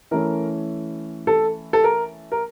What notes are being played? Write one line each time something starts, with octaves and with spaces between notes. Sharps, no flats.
E3 A3 C#4 A#4
A4
A4
A#4
A#4